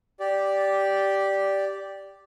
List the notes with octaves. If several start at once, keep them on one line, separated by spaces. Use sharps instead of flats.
G4 D5